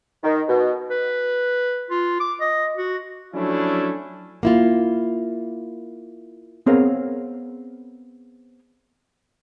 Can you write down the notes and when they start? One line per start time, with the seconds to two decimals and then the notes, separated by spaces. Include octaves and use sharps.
0.23 D#3
0.49 B2
0.91 B4
1.90 F4
2.20 D6
2.41 D#5
2.77 F#4
3.34 F3 F#3 A3 C#4 D4 E4
4.43 A#3 E4 F4
6.66 B3 C4 G#4 A#4 C#5 F5